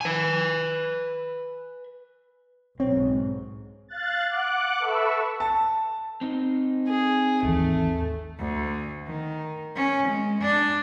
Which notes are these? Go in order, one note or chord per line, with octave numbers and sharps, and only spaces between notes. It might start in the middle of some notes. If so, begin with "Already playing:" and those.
B4 G#5
B1 G#2 C4 C#5
F5 F#6 A6
F#5 D6 F#6
A4 B4 E5 C#6 E6
A5
C4 D#4
G#4
G#1 D#2 E3 A3
D2
D#3
C#4
G#3
D4